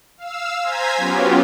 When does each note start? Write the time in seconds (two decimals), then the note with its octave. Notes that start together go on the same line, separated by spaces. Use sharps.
0.18 F5 E6
0.62 C5 G#5 A#5 G#6 B6
0.97 F#3 B3 C#4 F4 G4